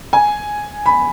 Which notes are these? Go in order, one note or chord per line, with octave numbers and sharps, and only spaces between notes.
G#5
B5